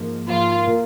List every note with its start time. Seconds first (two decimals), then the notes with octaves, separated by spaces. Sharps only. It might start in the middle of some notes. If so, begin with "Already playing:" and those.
Already playing: G#2 F3 A#3
0.28 G#2 F3 A#3 F4
0.66 A#2 A#3 F4